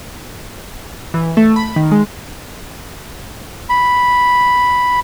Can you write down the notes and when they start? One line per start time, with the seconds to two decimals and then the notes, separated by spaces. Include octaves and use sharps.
1.14 E3
1.37 A3
1.56 B5
1.76 D#3
1.92 G#3
3.69 B5